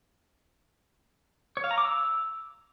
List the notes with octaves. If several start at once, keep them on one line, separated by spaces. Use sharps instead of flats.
C#5
F5
A#5
D6
E6